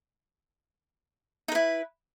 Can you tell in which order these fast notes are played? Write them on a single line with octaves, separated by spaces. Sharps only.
D#4 B4 E4